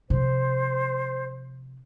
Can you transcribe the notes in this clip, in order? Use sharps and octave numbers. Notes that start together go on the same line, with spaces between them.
C3 F3 C5